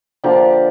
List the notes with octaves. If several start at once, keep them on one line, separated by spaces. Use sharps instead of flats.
D3 F3 A#3 G4